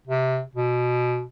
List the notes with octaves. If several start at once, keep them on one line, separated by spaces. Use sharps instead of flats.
C3
B2